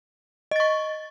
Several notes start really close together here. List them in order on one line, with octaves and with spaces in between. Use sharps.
D#5 A6 C#6